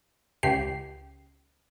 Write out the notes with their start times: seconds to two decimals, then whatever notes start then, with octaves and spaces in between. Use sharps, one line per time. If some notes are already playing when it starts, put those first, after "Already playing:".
0.43 C#2 G4 C7